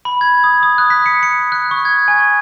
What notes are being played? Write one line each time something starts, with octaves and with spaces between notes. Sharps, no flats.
B5
G#6
D#6
D#6
F#6
B6
C#7
C#7
F#6
C#6
G#6
G#5